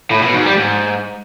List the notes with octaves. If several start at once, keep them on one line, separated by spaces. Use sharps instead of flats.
A2
B2
G#2
G3
G#2